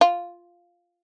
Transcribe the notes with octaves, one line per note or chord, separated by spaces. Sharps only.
F4